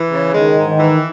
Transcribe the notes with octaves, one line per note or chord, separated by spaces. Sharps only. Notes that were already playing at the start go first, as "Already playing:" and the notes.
Already playing: E3
C#3
D#3 G#3
G#2
D#3
E3